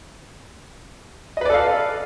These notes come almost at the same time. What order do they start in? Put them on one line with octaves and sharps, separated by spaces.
D#5 B4 D5 A4 F5